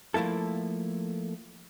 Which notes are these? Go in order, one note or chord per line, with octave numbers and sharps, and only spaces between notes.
F3 A3 A#3 E4 A4